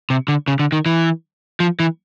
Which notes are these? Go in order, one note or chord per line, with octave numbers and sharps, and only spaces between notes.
C3
D3
C#3
D3
D#3
E3
F3
E3